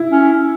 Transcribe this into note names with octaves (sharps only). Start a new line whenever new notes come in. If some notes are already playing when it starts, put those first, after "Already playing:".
Already playing: E4
C#4